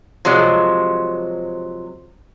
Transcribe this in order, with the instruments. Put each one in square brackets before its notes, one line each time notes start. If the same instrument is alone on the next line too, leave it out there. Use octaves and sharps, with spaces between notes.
[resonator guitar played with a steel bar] C3 F3 F#3 G#3